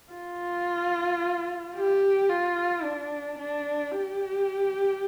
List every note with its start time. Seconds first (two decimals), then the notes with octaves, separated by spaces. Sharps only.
0.12 F4
1.76 G4
2.29 F4
2.83 D4
3.38 D4
3.92 G4